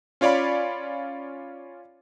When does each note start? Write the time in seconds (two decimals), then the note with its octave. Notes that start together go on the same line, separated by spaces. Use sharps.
0.21 C#4 F4 C#5 D5 F5 B5